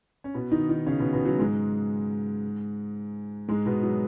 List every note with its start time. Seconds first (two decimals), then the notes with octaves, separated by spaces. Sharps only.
0.24 C#4
0.34 B2 B3
0.52 D#3 D#4
0.69 D#3 D#4
0.87 C#3 C#4
1.00 B2 B3
1.13 B2 B3
1.26 F#3
1.39 G#2 G#3
3.48 G#2 G#3
3.66 B2 B3
3.83 F#3